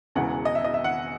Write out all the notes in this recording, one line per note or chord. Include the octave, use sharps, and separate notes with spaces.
E1 E2 C#3 E3 F#5
D#5
E5
D#5
E5
F#5